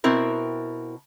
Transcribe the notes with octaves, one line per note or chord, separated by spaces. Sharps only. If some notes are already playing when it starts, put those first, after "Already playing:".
B2 C4 E4 A#4